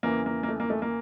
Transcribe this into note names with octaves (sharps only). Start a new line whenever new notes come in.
E2 C#3 E3 A#3
A#3
A#3
A3
A#3
A3
A#3